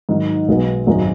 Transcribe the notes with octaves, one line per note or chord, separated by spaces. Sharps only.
G#2 D#3 F#3
B1 B2 G#3 B3
G#1 F#2 D#3 G#3 D#4